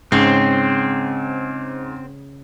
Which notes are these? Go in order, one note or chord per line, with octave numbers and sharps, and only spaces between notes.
G#2 C#3 C4